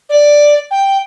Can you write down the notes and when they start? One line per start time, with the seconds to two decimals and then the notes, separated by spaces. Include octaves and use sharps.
0.09 D5
0.71 G5